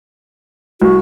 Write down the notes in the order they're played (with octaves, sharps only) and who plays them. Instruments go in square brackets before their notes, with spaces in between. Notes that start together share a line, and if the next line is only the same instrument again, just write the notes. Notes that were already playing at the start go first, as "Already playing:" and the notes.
[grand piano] C2 [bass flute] F#4